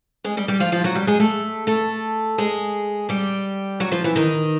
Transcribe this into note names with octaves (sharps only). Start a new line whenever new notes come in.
G#3 G#4
G3 G4
G3 G4
F3 F4
F3 F4
F#3 F#4
G3 G4
G#3 G#4
A3 A4
A3 A4
G#3 G#4
G3 G4
F#3 F#4
F3 F4
E3 E4
D#3 D#4